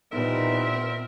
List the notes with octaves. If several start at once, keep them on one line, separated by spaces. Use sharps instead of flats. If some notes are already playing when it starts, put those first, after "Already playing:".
A#2 E3 G3 B3 C4 D#4 A#4 E5